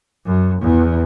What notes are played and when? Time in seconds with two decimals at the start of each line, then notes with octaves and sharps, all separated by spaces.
0.29 F#2
0.64 E2